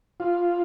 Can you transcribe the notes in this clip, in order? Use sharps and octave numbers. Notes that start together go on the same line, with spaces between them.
F4